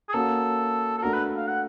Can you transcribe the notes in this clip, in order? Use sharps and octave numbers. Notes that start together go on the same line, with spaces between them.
G#4
A#3 C#4 F#4 A4
A4
A3 D4 F#4 A#4
B4
F5
F#5